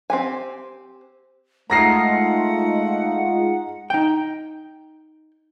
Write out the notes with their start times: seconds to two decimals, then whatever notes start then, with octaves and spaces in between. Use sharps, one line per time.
0.10 C4 G4 G#5
1.70 G#3 A3 D#4 F4 F#5 A#5 A#6 C7
3.90 D#4 G5